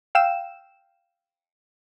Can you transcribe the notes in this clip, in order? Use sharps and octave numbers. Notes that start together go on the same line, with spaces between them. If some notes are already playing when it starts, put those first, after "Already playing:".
F5 G5 E6 E7